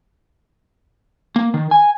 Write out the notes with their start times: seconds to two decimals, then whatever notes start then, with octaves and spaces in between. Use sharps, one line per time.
1.36 A#3
1.54 D#3
1.71 G#5